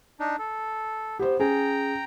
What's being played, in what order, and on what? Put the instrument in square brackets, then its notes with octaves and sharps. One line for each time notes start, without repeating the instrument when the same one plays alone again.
[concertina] D4 D#4
A4
[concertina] B3 [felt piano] G4 C5
[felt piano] C#4 G#4 [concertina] G5 A#5